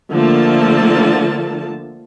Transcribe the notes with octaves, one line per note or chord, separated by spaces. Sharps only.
D3 F3 A3 A#3 A5